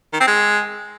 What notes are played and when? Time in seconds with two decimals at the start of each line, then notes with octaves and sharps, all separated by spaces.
0.13 D#3
0.20 C4
0.27 G#3